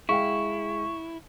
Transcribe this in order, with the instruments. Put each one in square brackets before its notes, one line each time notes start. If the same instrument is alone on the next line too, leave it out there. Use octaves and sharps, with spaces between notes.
[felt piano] G#3 F5 G5 [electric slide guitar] E4 [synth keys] C#6